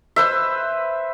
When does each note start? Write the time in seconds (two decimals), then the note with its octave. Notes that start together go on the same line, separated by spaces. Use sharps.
0.16 B4 C5 E5